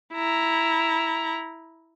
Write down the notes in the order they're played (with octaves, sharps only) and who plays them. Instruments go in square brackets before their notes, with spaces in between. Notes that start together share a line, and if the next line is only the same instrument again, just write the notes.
[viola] E4 A#5